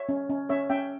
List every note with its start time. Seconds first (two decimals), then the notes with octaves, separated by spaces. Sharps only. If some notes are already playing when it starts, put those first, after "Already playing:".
Already playing: C#5 E5
0.09 C#4
0.30 C#4
0.49 C#4 C#5 E5
0.70 C#4 E5 G5